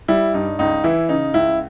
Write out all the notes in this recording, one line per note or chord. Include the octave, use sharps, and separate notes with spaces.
G3 E4
G2 D#4
C#2 D#4
E3 E4
C#3 D#4
C#2 E4